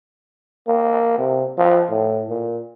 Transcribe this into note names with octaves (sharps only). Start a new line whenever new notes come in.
A#3
C3
F3
A2
A#2